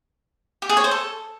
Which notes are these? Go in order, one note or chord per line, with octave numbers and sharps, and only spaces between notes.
G4
G#4
C#5
C5
A4